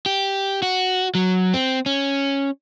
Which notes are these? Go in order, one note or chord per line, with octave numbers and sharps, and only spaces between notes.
G4
F#4
F#3
C4
C#4